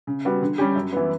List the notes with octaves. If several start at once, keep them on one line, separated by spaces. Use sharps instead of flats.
C#3
G3 B3 F#4
D3
G3 C#4 G4
F#2
E3 B3